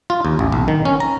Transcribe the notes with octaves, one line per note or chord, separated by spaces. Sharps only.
F4
D#2
A1
B1
D#3
C#4
A#5